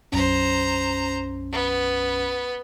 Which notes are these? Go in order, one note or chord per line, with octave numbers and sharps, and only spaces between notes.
B1 F#2 C#4 C5 A#5
B3